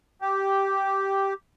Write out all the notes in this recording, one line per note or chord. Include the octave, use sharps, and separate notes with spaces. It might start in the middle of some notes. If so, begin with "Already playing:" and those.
G4